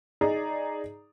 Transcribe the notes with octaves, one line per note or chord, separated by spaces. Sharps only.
D#4 G#4 D5 A#5